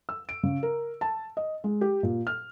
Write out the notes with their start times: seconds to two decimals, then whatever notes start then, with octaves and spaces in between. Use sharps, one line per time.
0.09 E6
0.29 D7
0.43 C#3
0.63 A#4
1.01 A5
1.37 D#5
1.64 G#3
1.81 G4
2.03 A#2
2.27 F6